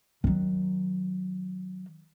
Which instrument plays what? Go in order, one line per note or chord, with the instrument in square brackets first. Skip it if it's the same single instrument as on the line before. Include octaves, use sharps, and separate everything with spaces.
[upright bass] D#3 F#3